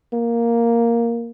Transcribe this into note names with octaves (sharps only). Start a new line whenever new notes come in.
A#3